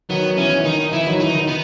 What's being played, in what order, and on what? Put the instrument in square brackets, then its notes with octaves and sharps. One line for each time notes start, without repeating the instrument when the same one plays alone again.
[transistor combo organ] D#3 F#3 [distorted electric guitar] B3
[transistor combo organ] E3 [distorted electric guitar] C#4
[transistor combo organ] E3
[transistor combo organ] D#3 [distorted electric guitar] D#4
[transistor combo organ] E3 [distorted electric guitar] E4
[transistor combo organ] D#3 F#3
[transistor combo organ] E3 [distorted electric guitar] D#4
[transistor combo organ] D#3
[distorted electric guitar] B3